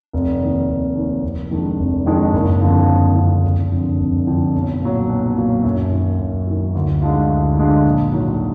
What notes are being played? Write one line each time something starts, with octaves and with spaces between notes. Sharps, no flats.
F1
D#2 D#3
F1
D#2 D#3
F1
F2 D#3 G#3 D4
F1
F2 D#3 G#3 D4
F#1
F2 D3 F3
F#1
F2 D3 F3
F1
F2 D3
F1
F2 D3
B1
A#2 F#3
B1
A#2 F#3
F#2
D#3 F#3
F#2
D#3 F#3
D2
D3 G#3 D4 F4
D2
D3 G#3 D4 F4
A#1
G#2 D#3 F#3